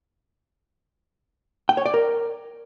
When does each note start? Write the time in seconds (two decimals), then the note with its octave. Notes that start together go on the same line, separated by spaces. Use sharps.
1.69 G5
1.77 C#5
1.86 D5
1.94 A#4